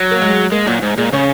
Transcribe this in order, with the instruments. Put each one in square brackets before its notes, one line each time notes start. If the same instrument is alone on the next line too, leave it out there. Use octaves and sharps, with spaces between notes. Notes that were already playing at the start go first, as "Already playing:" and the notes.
Already playing: [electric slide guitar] F#3
[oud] A#3
G#3
[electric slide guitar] G#3 [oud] A#3
[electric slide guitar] A#2 [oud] F#3
[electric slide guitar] G#2
[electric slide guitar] A#2 [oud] G#3
[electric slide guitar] C#3 [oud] C#4